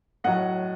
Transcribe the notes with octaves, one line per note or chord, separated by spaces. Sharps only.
A2 F#3 D#5 F#5